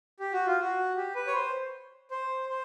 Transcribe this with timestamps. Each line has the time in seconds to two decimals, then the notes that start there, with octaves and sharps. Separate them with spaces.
0.20 G4
0.33 F#4
0.47 F4
0.60 F#4
0.96 G4
1.15 B4
1.27 C#5
1.35 C5
2.11 C5
2.49 C5